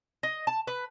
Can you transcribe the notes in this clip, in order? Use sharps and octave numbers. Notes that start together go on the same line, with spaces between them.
D#5
A5
B4